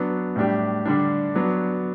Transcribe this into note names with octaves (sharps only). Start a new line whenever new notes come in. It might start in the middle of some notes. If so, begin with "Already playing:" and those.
Already playing: F#3 B3 D4
A2 G3 D4 G4
D3 G3 D4
F#3 B3 D4